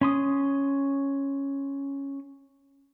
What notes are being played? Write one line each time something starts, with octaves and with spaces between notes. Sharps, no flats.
C#4 C6 D#6